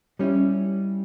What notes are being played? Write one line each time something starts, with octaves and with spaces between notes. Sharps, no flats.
G3 C#4 E4